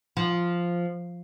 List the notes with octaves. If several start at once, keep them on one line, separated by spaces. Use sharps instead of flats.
F3